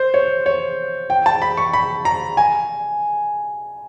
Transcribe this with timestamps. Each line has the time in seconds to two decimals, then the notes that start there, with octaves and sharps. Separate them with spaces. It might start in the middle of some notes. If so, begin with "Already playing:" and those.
Already playing: C5
0.14 C#5
0.46 C#5
1.10 G5
1.26 A5
1.42 B5
1.57 C#6
1.73 B5
2.05 A#5
2.37 G#5